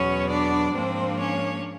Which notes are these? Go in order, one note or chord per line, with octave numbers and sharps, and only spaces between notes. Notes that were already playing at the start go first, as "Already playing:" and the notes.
Already playing: E2 B2 F#3 B3 C#4 C#5
D4 D5
G#2 F3 A#3 C4 D4 C5
C#4 C#5